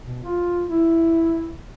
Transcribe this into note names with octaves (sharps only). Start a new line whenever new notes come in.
B2
F4
E4